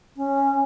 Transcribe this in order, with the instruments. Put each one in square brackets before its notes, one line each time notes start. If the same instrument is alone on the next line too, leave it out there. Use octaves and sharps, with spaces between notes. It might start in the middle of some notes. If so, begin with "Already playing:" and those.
[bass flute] C#4